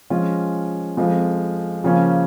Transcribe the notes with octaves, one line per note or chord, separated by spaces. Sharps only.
F3 G#3 C#4 F4
F2 F3 G#3
C#3 F3 A#3 C#4